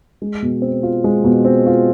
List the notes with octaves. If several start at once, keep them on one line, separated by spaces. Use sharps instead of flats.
G#3
B2
C4
F4
G#3
B2
C4
F4